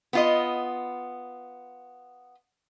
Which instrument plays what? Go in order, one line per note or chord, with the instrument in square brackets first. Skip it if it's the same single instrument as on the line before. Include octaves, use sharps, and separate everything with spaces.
[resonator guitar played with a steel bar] B3 F4 D#5